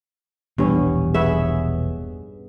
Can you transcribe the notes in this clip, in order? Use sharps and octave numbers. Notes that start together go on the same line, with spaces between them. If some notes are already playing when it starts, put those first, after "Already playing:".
E1 A#1 G2 E3 B3 C#4
B3 G#4 C#5 E5